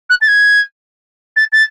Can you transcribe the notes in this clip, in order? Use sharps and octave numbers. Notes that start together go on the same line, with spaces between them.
F#6
A6
G#6
A6
A6